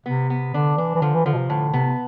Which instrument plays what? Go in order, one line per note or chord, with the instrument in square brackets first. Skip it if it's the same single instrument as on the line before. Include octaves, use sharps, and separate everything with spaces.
[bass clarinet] C3 [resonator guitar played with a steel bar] B3
[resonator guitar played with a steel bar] B3
[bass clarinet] D3 [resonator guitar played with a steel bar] D4
[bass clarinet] E3 [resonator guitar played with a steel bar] D4
[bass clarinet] E3
[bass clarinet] D3 [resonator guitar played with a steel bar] F3
[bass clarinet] E3
[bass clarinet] D3 [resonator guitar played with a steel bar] F3
[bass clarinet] B2
C3
[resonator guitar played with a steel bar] A2 [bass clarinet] D3
[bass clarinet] C3 [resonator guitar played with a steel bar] B3